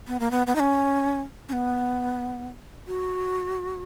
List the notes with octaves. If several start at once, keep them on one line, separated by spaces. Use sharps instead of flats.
B3
A#3
B3
B3
D#4
C#4
C#4
B3
F#4